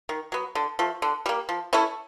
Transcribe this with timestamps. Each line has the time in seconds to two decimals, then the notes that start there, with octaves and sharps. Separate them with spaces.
0.09 D#3
0.32 F#3 B3
0.55 D3
0.79 F3 A3
1.02 D3
1.26 G3 A#3
1.49 F3
1.73 A3 C#4 E4